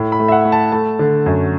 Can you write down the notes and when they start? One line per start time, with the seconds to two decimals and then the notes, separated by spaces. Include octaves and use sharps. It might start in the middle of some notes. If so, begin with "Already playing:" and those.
Already playing: A2
0.12 B5
0.19 A3
0.28 E5
0.32 F#5
0.45 A3
0.52 A5
0.72 A3 A5
0.99 D3
1.26 F#2